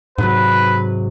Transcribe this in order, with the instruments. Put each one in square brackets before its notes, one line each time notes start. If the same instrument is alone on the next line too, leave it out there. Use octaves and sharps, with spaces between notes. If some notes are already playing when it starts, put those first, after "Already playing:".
[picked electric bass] G#2 C3 F#3 [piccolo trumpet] B4